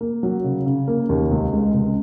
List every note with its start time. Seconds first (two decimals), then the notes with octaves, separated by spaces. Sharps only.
0.01 A#3
0.23 F#3
0.44 C#3
0.66 C#3
0.88 A#3
1.09 D#2
1.31 C#2
1.53 G#3
1.74 C#2